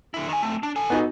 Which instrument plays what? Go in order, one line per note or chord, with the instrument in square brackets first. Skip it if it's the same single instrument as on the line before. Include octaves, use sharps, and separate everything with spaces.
[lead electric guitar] D3 E4
D#3 G#5
A3 C4
D4
A4 G#5
[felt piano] B3 D#4 F#4